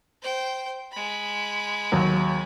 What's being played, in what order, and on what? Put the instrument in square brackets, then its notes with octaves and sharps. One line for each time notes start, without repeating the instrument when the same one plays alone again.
[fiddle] C5 G5
G#3 B5
[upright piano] D#2 F#3